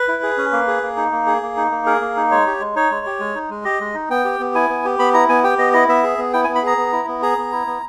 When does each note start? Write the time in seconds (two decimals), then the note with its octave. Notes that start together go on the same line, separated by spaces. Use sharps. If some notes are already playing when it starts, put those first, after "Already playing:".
Already playing: B4
0.08 E4
0.23 G#4
0.38 C#4
0.52 A#3
0.68 G#4
0.83 A#3
0.97 D#4
1.12 A#3
1.27 G#4
1.42 A#3
1.57 D#4
1.71 A#3
1.86 G#4 A#4
2.01 A#3
2.17 D#4
2.31 G#3 C#5
2.47 G4
2.60 G#3
2.76 D#4 C#5
2.91 G#3
3.06 G4
3.20 G#3
3.35 D#4
3.50 G#3
3.64 G4 D#5
3.80 G#3
3.94 D#4
4.10 B3 G5
4.25 G4
4.40 B3
4.55 E4 G#5
4.70 B3
4.85 G4
4.99 B3 B5
5.14 E4 A#5
5.29 B3 G#5
5.44 G4 G5
5.58 B3 D#5
5.73 E4 D#5
5.88 B3 E5
6.03 G#4
6.18 B3
6.33 E4 G5
6.44 G#5
6.49 B3
6.55 B5
6.62 G#4 A#5
6.77 B3
6.92 E4
7.08 B3
7.22 G#4 A#5
7.38 B3
7.52 E4
7.67 B3